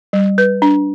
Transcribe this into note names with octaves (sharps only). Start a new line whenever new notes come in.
G3
B4
D4